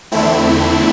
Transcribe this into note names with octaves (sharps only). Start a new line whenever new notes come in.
E2 D3 A3 C4 E4